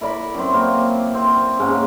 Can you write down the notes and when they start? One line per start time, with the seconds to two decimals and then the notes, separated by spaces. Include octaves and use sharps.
0.01 E4 A#4 D5 B5
0.35 F#2 C4
0.53 A#3 C4
1.14 C4
1.59 G#2 C#3 A#3